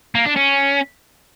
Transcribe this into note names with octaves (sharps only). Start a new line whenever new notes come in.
A#3
D4
C#4